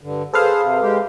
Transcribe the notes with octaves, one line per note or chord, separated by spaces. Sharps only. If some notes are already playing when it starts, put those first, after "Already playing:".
G2 D3
G#4 A4 B4 C5 F5
C3
G#3 G4